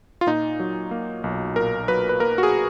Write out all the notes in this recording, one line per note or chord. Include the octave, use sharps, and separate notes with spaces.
F4
A#2 D#4
F#3
A#3
B1
A#2 A#4
F#3 B4
B4
A#3 A#4
F#4
G#4